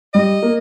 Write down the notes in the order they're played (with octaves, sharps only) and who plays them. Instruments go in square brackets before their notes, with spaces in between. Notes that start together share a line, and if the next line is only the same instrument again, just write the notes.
[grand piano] G3 [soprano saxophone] D#5
[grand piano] A#3